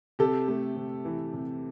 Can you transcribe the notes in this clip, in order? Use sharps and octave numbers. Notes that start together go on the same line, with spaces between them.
C3 G4 A4
A3
C3
E3
C3